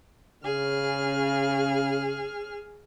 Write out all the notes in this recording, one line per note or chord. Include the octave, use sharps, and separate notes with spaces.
C#3 G#4 F6